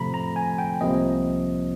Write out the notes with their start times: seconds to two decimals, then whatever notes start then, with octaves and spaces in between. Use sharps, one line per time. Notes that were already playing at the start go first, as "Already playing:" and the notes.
Already playing: C3 F3 A3 A#5 B5
0.14 A#5
0.36 G#5
0.58 G5
0.81 C2 C3 F3 A#3 D#5